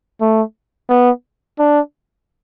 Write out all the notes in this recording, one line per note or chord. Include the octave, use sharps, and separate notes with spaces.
A3
B3
D4